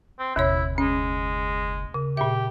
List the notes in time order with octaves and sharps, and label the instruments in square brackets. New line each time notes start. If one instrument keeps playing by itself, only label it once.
[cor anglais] C4
[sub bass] F#1 [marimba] D#2 B2 C#5 [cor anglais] E4
[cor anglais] G#3 [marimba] C#4
[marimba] C#3
[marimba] A#2 E5 [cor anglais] G4